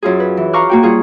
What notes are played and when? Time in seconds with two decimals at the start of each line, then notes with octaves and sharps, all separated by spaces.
0.03 F#2 F4 G#4
0.20 B4
0.37 E3
0.53 F5 A#5 C#6 D6 F6 F#6
0.70 A#3 F#4 G5
0.83 G3 F4 G#4 C#6